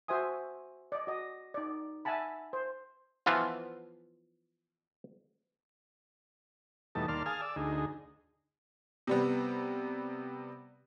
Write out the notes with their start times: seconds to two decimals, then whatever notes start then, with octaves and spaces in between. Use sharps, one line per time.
0.08 F#4 C5 E5 G#5 D#6
0.92 D5 D#5
1.07 F#4 D#5
1.54 D#4 D5
2.05 E5 F#5 G#5 A5 B5
2.53 C5
3.26 E3 F3 B3 F4
6.95 E2 B2 G3 A3 D#4 A5
7.08 D#2 A#3 D5 A5 C6 F6
7.26 G#4 F5 G#5 A5 D#6 F6
7.42 D5 E6
7.56 D2 D#4 G#4
9.07 C3 G3 B3